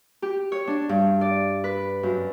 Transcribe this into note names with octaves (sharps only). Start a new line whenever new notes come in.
G4
C#5
D4
G2
D5
B4
F#2